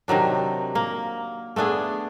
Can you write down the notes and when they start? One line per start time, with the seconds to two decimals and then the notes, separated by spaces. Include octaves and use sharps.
0.08 C3 D#3 F#3 D4
0.75 A#3
1.56 A3 B3 D4 G#4